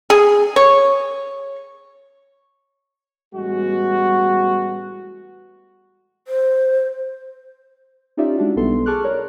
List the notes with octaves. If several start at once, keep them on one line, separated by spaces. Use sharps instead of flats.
G#4
C#5
A1 G3 G#3 B3 F#4
C5
C#4 D#4 F4 G4 D5 E5
G#3 D4 F#4
B1 G3 B3 A4 C6
G#4 A5 C#6 D6 F6 F#6
A#4 C#5 D5